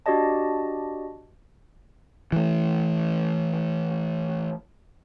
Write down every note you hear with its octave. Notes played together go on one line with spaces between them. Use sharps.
D4 F#4 G4 D5 D#5 A5
E3 A3